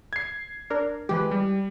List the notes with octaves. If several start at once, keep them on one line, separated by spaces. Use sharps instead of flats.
G#6 C7
D4 A#4
E3 G#3 G4 B4
G3